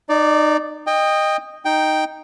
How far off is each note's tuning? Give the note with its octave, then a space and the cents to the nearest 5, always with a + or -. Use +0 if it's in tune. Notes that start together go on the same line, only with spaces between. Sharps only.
D#4 -25 D5 +0
D#5 -10 G5 +25
D#4 +0 G5 +0